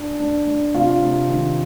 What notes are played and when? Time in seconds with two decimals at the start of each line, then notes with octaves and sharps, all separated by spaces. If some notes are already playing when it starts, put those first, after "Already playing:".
Already playing: D4
0.20 D4
0.47 D4
0.75 C3 F4
1.01 C3
1.28 D#3